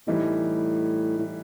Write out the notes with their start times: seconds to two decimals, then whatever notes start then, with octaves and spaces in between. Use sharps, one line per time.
0.07 A2 E3 G3 D#4
1.18 A2